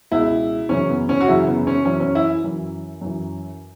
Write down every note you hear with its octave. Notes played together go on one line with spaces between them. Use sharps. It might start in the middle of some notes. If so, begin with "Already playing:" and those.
C#2 B2 E4
F#2 C#3 E3 C#4
B3
C#4
F#4
F#2 C#3 E3 E4
B3
C#4
F#2 E3 C#4
C#4
E4
F#2 E3
F#2 E3